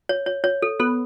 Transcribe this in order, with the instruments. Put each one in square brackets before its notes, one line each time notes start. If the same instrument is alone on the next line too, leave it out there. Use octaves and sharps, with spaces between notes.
[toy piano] C#5
C#5
C#5
A4
[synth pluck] B3 [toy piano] A4